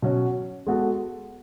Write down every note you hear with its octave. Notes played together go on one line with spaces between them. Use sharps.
B2 F#3 C#4 F#4
G#3 B3 F#4 A4